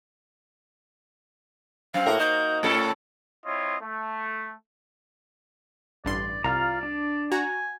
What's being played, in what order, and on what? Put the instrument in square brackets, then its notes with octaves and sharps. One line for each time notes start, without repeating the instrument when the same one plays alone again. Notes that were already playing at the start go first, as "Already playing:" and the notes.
[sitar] F#2 C4 [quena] F5
[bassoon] A2 [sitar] A#3 F#4 A#4
[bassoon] D#4 [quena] G6
[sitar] A2 C#4 A4 [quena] B5
[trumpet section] C4 E4 F4 C#5 D#5
A3
[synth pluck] A1 G2 C6 [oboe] D5
[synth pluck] C2 [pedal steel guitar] F4 F5 A#5 [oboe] D5
[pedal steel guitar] D4
[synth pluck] F#4 A#5 [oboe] G#5